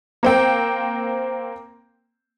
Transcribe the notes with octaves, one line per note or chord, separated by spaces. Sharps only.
A#3 C4 G5